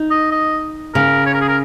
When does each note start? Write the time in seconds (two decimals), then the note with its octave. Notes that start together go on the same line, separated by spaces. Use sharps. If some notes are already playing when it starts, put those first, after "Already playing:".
Already playing: D#4
0.11 D#5
0.32 D#5
0.94 C#3 A#4
1.26 C#5
1.34 A#4
1.41 G#4
1.48 A#4